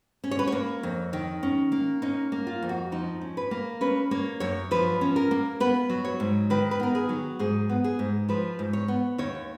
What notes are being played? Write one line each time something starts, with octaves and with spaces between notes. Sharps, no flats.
C#4
C#5
B4
A#3 C#5
F2
D#3
C#4
A#3
C#4 D#4
A#3
F4
F2
F#4
F3 D#4
C#4
B4
A#3
C#4 B4
A#3 C#5
F#2 C#5
F3 B4
C#4
A#4
A#3
B3 B4
F#3
C#5
G#2
D#3 B4
B4
B3 A#4
G#4
F#3
G#2 G#4
B3
G#4
G#2
F3 B4
G#2
C#5
B3
D#2 C#5